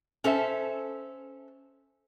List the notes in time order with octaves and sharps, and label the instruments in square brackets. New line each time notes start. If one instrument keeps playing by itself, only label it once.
[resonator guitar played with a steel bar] C#4 A4 C5 E5